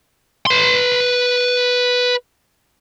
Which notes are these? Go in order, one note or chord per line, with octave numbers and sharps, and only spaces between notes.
B4 C6